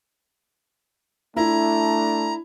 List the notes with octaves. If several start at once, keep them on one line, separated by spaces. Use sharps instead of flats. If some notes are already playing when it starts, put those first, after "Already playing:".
A3 D4 E4 A#5